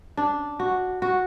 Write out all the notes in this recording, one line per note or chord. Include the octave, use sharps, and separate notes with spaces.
D4
F#4
F#4